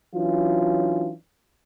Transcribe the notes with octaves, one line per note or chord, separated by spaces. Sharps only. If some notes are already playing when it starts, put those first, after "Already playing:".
E3 F#3 C#4 D4 F4